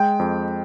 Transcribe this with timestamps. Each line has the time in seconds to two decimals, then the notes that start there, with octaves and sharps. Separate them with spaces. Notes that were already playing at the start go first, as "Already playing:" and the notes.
Already playing: G#3 G5
0.19 F2